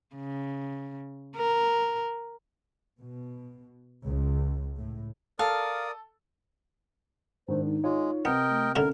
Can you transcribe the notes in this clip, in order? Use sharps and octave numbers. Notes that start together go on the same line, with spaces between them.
C#3
A#4
B2
C#2
A2
A4 A#4 D5 F5 D#6
G#2 D#3 D4 C5
D#4
G#3 F4 C#5
C3 B3 A#4 D#5 G5
A3
A2 D3 C#4 E4 A#4